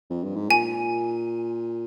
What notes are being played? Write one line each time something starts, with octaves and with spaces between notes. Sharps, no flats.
F2
G2
G#2
A#2 G#5